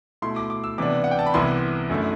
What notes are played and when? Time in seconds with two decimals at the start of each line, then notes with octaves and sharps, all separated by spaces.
0.22 B2 A3 E4 C6
0.36 D6
0.50 D6
0.64 E6
0.78 C3 E3 B3 D4 D6
1.04 F#5
1.11 G5
1.19 A5
1.26 B5
1.34 C2 C3 E3 B3 E4 C6
1.90 F#2 D3 A3 E4